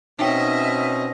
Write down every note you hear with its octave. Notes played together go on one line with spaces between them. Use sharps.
B2 C4 C#4 D#4 D#5 E5 G5